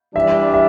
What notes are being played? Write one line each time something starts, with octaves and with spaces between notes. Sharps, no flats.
E3 G3 D4 E5
E5